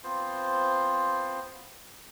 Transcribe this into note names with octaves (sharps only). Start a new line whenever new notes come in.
B3 C4 F4 C5